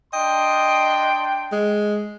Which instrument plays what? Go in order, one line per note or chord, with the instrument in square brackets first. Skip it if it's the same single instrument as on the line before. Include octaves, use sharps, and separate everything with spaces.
[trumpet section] D4 G5 C6 [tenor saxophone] D#5
[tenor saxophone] G#3